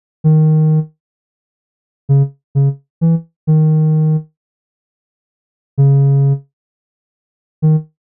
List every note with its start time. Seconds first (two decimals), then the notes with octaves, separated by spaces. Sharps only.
0.24 D#3
2.09 C#3
2.55 C#3
3.01 E3
3.47 D#3
5.78 C#3
7.62 D#3